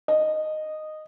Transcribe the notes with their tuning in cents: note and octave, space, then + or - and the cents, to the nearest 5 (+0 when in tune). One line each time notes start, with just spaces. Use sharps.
D#5 -10